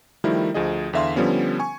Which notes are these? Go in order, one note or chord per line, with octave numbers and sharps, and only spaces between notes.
D#3 F3 G3 A3 E4 A#4
D2 F3 G#4 D#5
E2 D3 E5 F5 C6
D3 F3 G3 B3 C#4
G#5 C#6